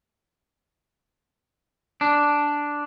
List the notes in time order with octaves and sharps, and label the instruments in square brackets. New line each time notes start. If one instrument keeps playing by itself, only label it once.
[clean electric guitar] D4